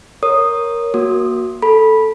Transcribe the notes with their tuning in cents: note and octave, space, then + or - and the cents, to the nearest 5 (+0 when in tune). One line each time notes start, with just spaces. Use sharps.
A#4 +0 C#5 -5 D#6 -10
A#3 +20 F#4 +0 D#6 -35
A4 +0 B5 -15